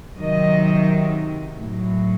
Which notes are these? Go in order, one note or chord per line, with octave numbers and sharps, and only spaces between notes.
C3 D#3 F#3 D#5
A2 F#3